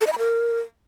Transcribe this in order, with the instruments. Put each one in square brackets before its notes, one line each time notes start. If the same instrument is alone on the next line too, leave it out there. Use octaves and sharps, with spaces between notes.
[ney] A4
D#5
B5
A#4